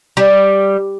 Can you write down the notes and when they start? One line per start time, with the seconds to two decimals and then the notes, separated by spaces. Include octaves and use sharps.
0.17 G3